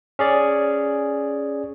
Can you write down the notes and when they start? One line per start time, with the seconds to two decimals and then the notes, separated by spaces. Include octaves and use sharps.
0.19 C#4 G#4 D5